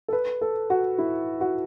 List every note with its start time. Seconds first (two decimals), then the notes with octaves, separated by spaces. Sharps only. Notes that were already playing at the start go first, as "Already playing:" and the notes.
0.08 A4
0.13 B4
0.41 A4
0.70 F#4
0.98 E4
1.41 F#4